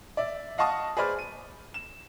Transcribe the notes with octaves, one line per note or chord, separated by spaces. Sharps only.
D5 E5
D#5 F5 F#5 A5 C#6 D#6
G#4 B4 C5 D5 B5 F6
D#7
E7